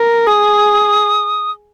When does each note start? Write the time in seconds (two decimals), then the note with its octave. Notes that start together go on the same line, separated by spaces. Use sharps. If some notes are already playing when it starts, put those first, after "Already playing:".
Already playing: A#4
0.27 G#4 D#6